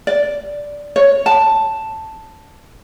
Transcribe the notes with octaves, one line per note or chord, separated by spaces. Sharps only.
D5
C#5
A5